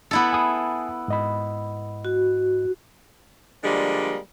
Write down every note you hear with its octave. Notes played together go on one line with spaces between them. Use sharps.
B3 E4 A4
G#5 D#6
G#2 D#5 B5
F#4
D3 F3 G3 G#3 A#3